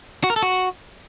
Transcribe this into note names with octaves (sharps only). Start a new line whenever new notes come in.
F#4
A#4
A4
F#4